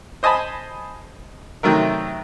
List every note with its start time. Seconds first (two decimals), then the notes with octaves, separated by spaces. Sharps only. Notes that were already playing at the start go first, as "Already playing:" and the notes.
0.23 C5 D#5 G#5 A5 B5
1.63 C3 D#3 F#3 A3 A#4